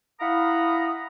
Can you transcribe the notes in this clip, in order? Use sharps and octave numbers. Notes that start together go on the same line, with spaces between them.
E4 F5 F#5 A#5 B5 D#6